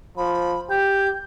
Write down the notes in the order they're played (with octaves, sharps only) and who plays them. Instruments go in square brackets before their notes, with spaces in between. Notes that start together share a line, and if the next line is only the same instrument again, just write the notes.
[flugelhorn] F3 [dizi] B5
[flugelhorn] G4 [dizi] G6